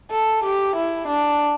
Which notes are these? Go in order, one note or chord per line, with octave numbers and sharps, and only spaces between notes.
A4
G4
E4
D4